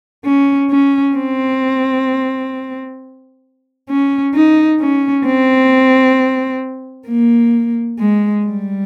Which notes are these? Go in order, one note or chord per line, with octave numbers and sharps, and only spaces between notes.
C#4
C#4
C4
C#4
D#4
C#4
C4
A#3
G#3
G3